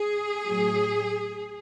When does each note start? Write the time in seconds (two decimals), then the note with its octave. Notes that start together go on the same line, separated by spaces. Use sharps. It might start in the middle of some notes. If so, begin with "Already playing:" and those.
Already playing: G#4
0.45 A2 F#3